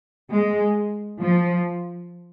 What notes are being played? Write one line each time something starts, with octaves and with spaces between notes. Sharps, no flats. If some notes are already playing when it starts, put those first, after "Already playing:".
G#3
F3